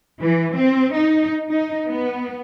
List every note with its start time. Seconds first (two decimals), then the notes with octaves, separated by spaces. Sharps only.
0.20 E3
0.56 C4
0.95 D#4
1.48 D#4
1.86 B3